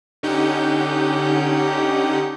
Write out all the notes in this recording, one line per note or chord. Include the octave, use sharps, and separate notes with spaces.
D3 C#4 D#4 G4 F#5 G6